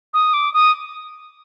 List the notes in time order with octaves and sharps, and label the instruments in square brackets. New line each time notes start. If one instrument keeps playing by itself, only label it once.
[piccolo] D#6
D6
D#6